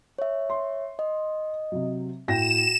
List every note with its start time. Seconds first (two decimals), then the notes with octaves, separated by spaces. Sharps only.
0.18 C#5 E5
0.50 C6
0.99 D#5
1.72 C3 F#3
2.28 A2 F#4 G5 A#6 E7